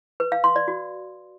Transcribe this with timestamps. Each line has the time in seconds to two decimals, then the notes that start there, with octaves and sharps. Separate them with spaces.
0.20 B4
0.32 F5
0.44 C6
0.56 D5
0.68 F#4